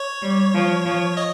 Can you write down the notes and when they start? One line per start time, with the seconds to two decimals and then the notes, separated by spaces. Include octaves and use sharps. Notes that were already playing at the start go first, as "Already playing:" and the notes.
Already playing: C#5
0.22 G3
0.54 F3
0.86 F3
1.17 D#5